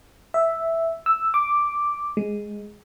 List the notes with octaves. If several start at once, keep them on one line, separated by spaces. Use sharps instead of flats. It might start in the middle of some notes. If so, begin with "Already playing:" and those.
E5
E6
D6
G#3